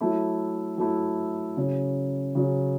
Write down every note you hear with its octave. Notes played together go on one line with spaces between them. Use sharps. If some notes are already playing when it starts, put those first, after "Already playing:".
F#3 A3 E4
F#3 A3 E4
C#3 F#3 C#4
C#3 F#3 C#4